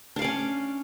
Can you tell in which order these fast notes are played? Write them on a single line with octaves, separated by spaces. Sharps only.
D4 F5 D5 C#4